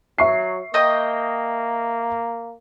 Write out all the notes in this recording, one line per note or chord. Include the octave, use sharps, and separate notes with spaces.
F#3 E5 C#6 C7
A#3 D#5 G5 D#6